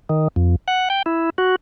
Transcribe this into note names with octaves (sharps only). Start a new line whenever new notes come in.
D#3
F2
F#5
G5
E4
F#4